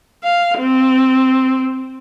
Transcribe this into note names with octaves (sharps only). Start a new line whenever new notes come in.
F5
C4